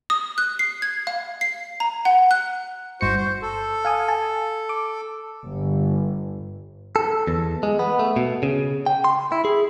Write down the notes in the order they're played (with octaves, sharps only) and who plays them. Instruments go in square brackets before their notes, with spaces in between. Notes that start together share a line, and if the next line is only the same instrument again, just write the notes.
[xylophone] D#6
F#6
C7
G#6
F5
C7
A#5
F#5
F#6
[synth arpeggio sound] G1 G2 C#7 [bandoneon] F#4 C5
[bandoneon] C5
A4
[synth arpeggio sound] F5 G#5 D#6
G#5 A5
D6
[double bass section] G1
[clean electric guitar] A4
E2
G#3
B3
A3
B2
C#3
G5
C6
E4
G#4